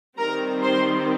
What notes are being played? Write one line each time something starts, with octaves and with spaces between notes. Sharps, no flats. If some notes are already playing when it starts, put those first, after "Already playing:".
D#3 G3 C4 A#4 A#5
C5 C6